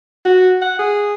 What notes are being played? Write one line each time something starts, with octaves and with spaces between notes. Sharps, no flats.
F#4
F#5
G#4